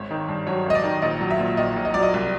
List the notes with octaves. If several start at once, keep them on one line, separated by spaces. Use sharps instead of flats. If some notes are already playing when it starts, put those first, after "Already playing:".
Already playing: G#1 C#5
D#3
G2
F#3 C#5
G#1 D#5
D5
D#3
A#1 D#5
F#3
E5
A#2
A#1 D#5
A#1
D#5
F#3 D5
D#5
C2